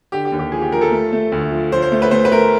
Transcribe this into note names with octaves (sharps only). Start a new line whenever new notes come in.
D3 G4
G4
D#2
G4
F3 G#4
G4
F3 A#4
A4
A3
A3
D2
F3
F3 C5
C5
A3
B4
A3 C5
B4
A3 A#4